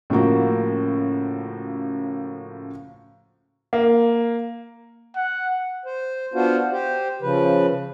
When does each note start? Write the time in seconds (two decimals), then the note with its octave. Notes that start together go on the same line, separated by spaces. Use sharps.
0.10 A2 C#3 F3 A#3 F#4
3.73 A#3
5.16 F#5
5.86 C5
6.34 B3 D4 F4 F#4 C5
6.72 G4 C5
7.22 C#3 F3 B4